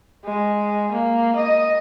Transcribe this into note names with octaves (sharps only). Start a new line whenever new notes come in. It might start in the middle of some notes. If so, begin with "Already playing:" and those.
G#3
A#3
D#5